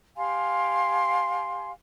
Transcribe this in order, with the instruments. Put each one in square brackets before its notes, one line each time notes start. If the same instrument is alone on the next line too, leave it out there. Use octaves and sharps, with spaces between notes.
[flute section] G4 F5 G#5 C6